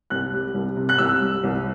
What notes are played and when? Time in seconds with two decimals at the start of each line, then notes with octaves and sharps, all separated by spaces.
0.10 C2 F#6
0.33 G3
0.54 C2
0.76 C3
0.89 F#6
0.98 C2 E6
1.21 G3
1.44 C2